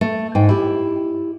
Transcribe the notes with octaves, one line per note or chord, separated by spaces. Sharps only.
A3
G#2 G5
E4 G4